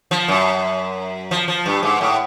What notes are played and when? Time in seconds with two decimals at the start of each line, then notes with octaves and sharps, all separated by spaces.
0.11 F3
0.28 F#2
1.31 F3
1.48 F3
1.66 G2
1.83 G#2
2.01 A2